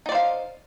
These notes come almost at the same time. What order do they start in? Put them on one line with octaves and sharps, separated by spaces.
D#4 D5 C5 F5